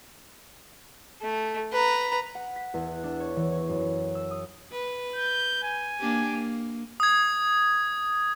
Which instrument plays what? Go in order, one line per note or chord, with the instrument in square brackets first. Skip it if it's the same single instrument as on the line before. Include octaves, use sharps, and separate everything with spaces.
[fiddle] A3
B4 A#5
[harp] F#5
B6
E2
F#6
D4
C#5
E3
C#5
F#2
E6
D#6
[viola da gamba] B4
[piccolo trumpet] G6
G#5
[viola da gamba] A#3 D4 G4
A#3
[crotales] D#6 G#6